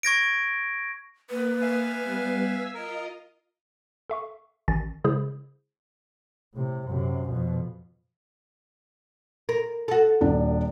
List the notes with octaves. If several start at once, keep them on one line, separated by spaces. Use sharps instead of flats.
C#6 G#6 A#6 D7
A#3 B4
E5 F5 G#5
G3 B3
E6 G#6 B6
F4 A#4 D#5
A4 E5 C#6
A1 D#3 G#5 A6
C#3 G#3 E4 G#4 C5
A2 C3
F#2 C3
F2 B2
A#4
F#4 A4
D#1 D4